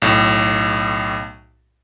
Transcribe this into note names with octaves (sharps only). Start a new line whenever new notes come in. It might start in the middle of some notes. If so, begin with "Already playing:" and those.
B1 A2